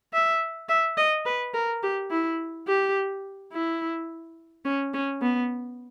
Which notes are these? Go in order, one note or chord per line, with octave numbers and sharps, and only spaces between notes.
E5
E5
D#5
B4
A#4
G4
E4
G4
E4
C#4
C#4
B3